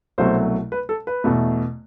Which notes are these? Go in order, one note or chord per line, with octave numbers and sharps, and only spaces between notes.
C2 B2 F#3 A3 C5
B4
A4
B4
E2 B2 A3